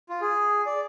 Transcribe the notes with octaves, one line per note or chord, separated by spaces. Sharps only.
F4
G#4
D5